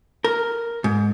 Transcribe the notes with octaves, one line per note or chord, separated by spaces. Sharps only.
A#4
G#2